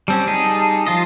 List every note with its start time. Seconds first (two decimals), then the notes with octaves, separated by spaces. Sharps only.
0.08 G3 C4 C#4 A5
0.27 G3 D#4 G#4
0.86 F3 F4 D#5